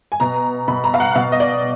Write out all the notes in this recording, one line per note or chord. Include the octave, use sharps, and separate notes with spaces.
G#5
B2 A#5
B2 B5
A#5
F5
F#5
B2 F5
D#5
D5